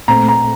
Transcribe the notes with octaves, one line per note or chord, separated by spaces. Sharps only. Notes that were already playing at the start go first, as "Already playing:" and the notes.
A#2 A3 C4 A#5
A#5